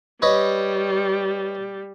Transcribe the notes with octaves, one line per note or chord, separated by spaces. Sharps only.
G3 B4 C#5 D#5